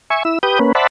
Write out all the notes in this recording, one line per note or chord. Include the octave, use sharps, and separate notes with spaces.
E5 G#5 C#6
E4 E6
G4 B4 D#6 G6
A#3 C#4 B4
C5 D5 E5 F#5 A5 B5